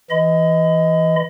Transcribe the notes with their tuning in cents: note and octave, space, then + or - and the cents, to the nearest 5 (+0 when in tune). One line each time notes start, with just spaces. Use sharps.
E3 +0 D#5 +15 B5 +40